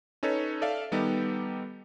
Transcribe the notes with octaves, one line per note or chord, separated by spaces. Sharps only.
C#4 D#4 A4 B4 C#5
A4 D5 E5 F5
D#3 G3 B3 D#4 G4 A4